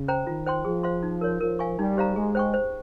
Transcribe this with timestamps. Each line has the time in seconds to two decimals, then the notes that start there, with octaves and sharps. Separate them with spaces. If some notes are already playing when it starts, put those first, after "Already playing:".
Already playing: C#3
0.08 C5 G5 A#5
0.27 D#3 F4
0.46 C5 G5 C6
0.65 F3 G#4
0.83 C5 F5 C6
1.03 D#4
1.21 A#4 C#5
1.40 F3 A#4
1.59 F5 G#5 C#6
1.79 G3 D#4
1.97 G4 C5 F5 A#5
2.15 G#3 G#4
2.35 C5 G5 C#6
2.54 C5